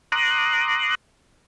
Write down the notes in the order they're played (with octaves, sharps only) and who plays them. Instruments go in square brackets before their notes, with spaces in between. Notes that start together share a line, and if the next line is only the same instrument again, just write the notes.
[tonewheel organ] A#5 C6 D6 D#6 F#6